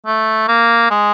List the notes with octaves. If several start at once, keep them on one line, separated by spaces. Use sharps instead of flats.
A3
A#3
G#3